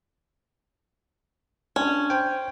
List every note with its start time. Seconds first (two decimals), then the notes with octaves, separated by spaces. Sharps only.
1.76 C#4 D4
2.10 C5 G5